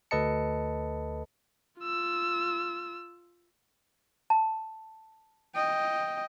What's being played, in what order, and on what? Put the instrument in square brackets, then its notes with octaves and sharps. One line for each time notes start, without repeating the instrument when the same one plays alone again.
[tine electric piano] D2 A4 B4 D#5 A5 C#7
[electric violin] F4 E6
[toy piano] A5
[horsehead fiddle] D#5 G5